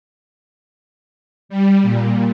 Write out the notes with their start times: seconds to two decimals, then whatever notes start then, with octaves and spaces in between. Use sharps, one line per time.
1.49 G3
1.82 A#2